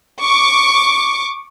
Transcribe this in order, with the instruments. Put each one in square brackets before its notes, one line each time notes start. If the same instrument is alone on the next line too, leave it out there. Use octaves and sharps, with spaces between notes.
[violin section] C#6 D6